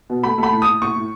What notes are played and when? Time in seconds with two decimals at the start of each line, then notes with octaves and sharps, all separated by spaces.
0.10 B2
0.23 A3 B5
0.38 A3 B5
0.52 A2
0.62 D#6
0.67 A2
0.82 A2 C#6
0.96 A2